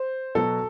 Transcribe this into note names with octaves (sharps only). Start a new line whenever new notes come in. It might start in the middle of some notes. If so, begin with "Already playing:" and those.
Already playing: C5
B2 F#3 A4